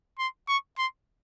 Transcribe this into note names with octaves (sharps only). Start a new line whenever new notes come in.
C6
C#6
C6